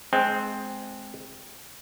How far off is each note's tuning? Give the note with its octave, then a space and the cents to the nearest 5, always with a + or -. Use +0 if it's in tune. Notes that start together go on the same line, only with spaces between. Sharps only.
G#3 +25 C4 +0